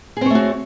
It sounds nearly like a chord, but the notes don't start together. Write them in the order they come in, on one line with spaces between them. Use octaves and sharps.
G#4 C4 C#5 A3 F#4